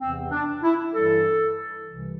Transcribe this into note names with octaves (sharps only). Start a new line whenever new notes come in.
E2 C3 E3 C4
D4
E4
G2 E3 G3 A4
C2 C3 E3